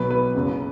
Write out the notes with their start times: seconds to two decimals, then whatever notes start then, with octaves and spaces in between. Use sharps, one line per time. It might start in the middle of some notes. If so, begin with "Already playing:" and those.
Already playing: B1 B2 F#3 B4
0.11 B4
0.35 F#1 F#2 C#3